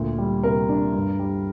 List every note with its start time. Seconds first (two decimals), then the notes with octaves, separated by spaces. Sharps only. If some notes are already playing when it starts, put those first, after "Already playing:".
Already playing: D2 A#2
0.18 G3
0.43 C3 A#4
0.69 D4
0.94 G2
1.19 G3